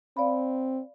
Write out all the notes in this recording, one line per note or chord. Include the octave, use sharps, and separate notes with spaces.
C4 D5 F5 B5